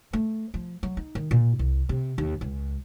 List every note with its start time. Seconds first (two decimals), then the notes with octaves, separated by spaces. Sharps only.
0.13 A3
0.54 F3
0.83 F#3
0.97 D#4
1.15 D#3
1.31 A#2
1.59 C2
1.89 C3
2.18 D#2
2.41 C#2